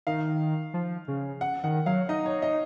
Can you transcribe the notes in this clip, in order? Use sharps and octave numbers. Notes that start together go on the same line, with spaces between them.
D#3 F5
F3
C#3
F#5
D#3 F#5
F#3 F5
D#4 D#5
C#5
D#5